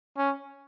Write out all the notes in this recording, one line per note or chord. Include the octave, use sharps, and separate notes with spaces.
C#4